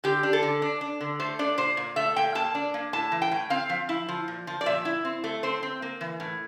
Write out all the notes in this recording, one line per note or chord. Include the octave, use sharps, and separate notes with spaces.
D3 G4
D4
A4
D3
D4
D4
D3
A3 C5
D4 D5
A#2 C5
A#2
A3 E5
A#2 G5
A#3 A5
D4
A#3
A2 A5
E3
G5
A2
C4 F5
F3
E4
F3
A#2
F3
D5
A#2 E5
E4
C4
A3
C4 C5
C4
A#3
E3
A2